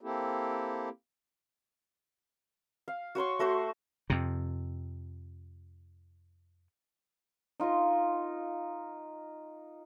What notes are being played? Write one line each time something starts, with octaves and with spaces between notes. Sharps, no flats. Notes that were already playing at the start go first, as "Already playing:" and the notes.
A#3 C4 E4 G4 A4
F5
F#4 C#5 C6 C#6
A3 F#4 C5 C#6
F2 C3
D#4 F4 A#4 D#5